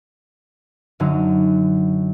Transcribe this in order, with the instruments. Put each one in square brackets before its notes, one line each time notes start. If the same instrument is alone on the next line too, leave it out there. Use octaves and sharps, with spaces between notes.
[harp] F#2 D3 F#3 D#4